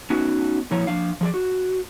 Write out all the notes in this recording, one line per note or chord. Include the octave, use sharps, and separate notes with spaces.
B3 C#4 D#4 F#4 F#5
A#2 F3 E4 C#5 A#5
F3 D4 F5
F3 G#4 D5
F#4